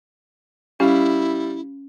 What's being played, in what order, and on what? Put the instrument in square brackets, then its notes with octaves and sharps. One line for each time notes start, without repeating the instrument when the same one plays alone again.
[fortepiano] G3 F5 [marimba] C#4 [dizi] E4